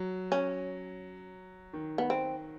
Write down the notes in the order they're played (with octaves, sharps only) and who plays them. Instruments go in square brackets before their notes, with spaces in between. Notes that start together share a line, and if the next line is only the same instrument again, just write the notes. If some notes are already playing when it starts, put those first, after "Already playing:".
Already playing: [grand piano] F#3
[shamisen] C#4
[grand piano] D#3
[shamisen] B3
C4